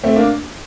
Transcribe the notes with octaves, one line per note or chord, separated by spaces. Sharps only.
A3 C4
A#3 D4